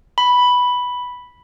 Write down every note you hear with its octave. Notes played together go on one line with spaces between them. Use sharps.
B5